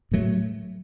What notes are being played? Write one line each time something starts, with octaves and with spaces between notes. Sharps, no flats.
A2 F#3 A3